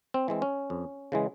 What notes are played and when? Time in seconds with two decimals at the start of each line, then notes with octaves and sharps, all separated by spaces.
0.14 C4
0.28 E3 G#3 C4
0.42 C#4
0.70 F2
1.12 C#3 E3 G#3